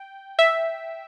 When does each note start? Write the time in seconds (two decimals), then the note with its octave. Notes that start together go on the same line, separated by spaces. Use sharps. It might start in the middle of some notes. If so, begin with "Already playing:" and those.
Already playing: G5
0.39 E5